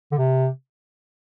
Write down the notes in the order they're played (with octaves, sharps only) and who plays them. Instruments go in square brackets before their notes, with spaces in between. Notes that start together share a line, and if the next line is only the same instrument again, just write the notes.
[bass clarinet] D3
C3